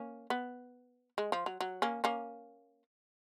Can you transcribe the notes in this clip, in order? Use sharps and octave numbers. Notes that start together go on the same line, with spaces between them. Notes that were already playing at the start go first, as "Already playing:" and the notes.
Already playing: A#3 C#4
B3
G#3
F3
F#3
F#3
A#3 C#4
A#3 C#4